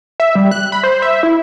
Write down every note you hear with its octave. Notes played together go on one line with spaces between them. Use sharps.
E5
G3
F#6
B5
C5
E5
E4